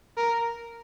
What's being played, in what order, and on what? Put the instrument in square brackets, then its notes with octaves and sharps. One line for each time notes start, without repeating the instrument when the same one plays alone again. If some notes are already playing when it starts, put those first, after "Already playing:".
[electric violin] A#4